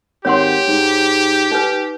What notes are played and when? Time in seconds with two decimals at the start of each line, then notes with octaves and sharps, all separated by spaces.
0.25 G#1 G4 C#5 F#5 C6
0.68 G#2
1.52 D#4 B4